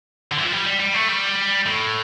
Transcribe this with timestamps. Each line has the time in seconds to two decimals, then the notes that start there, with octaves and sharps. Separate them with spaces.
0.31 D3
0.37 E3
0.45 F3
0.52 G3
0.66 G3
0.80 G3
0.94 A3
1.09 G3
1.66 A2